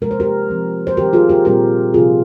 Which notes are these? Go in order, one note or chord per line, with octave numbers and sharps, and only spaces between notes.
C3 F3 G#3 A#4
C5
G4 A#4
F3 C4
C5
D#3 G3 C4 G4 A#4
F4 G#4
G4 A#4
A#2 G3 C4 G4 A#4
C3 F3 C4 F4 G#4